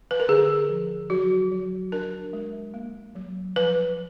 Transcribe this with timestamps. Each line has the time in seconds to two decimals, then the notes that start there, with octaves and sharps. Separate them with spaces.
0.11 B4
0.20 A#4
0.29 D3 G#4
0.69 F3
1.10 F#3 F#4
1.51 F#3
1.92 D4 A#4
2.33 G#3
2.74 A#3
3.15 F#3
3.56 F3 B4